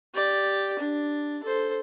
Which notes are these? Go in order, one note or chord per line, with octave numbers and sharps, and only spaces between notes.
G4 D5
D4
A4 C5